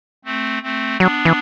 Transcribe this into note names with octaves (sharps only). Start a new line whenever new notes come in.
A3 C4
A3 C4
F#3 B3 D4
E3